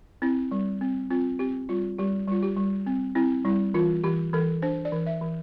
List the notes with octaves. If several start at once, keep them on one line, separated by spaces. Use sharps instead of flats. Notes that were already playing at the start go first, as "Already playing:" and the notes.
C4 E4
G3
C4
C4 F4
C4 G4
G3 F4
G3 G4
G3 F4
G4
G3
C4
C4 E4
G3 E4
E3 F4
E3 G4
E3 A4
D4 C5
D5
E3
E5
E3